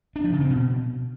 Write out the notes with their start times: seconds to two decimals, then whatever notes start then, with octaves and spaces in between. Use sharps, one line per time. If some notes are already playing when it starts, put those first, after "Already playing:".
0.16 D4
0.24 F3
0.33 C#3
0.41 C4
0.50 B2